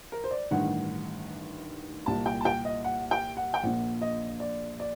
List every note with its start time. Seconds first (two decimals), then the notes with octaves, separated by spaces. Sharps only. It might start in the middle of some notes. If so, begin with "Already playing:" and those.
0.12 A#4
0.24 C5
0.31 D5
0.51 A1 G2 D#3 F#5
2.06 C2 A#2 A5
2.26 G5
2.41 A5
2.45 G5
2.65 D#5
2.84 F#5
3.11 G5
3.37 F#5
3.54 G5
3.63 A#1 A#2 F#5
4.01 D#5
4.40 D5
4.80 D5